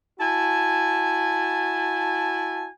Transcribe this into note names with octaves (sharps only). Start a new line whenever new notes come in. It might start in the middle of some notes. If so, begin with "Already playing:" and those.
E4 F#4 G#5 A5